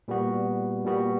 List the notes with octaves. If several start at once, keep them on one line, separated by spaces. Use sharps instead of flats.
A#2 G3 B3 F#4
A#2 G3 B3 F#4